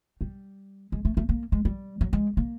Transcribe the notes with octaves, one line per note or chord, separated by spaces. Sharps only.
G3
G#3
A3
A3
A#3
G#3
G3
F#3
G#3
A#3